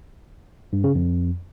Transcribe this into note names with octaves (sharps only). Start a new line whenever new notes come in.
G2
C#3
F2